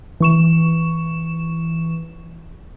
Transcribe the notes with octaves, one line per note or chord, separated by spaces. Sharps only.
E3 C#6 E7